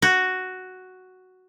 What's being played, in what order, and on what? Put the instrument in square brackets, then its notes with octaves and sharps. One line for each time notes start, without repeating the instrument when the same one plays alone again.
[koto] F#4